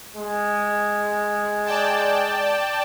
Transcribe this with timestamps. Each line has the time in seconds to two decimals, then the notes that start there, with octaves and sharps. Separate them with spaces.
0.16 G#3
1.66 D5 G5 A5